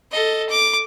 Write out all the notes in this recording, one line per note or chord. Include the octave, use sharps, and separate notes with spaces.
A4 D#5
D6